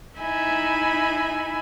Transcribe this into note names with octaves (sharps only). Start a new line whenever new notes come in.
D#4 E4 E5 G#5 B5